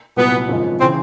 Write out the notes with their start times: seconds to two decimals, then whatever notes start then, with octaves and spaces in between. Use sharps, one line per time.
0.16 C2 A#2 F#3 B3
0.48 G#1 F#2 C#3 F3 G#3
0.80 C#3 E3 C4